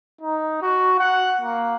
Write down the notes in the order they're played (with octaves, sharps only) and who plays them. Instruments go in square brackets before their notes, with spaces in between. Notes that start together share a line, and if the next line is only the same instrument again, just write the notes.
[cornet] D#4
F#4
F#5
A#3